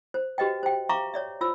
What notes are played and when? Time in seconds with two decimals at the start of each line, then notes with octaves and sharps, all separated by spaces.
0.14 C5
0.38 F#4 G4 B4 D#5 G5
0.63 C5 G5
0.89 E5 F5 A#5 C#6 D6
1.14 C#5 D5 E5
1.41 F4 C5 E6